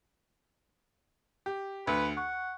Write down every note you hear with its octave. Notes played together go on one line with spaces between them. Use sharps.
G4
D2 B4
F#5 C#6